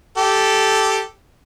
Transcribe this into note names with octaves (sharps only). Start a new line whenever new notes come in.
G4 A4